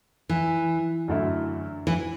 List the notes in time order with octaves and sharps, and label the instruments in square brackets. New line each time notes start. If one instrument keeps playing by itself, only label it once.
[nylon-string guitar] E3
[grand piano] F#2 D3 A3 E4
[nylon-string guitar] E3